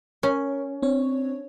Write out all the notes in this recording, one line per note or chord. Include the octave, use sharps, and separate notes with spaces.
C#4 A#4
C4 D4 C#5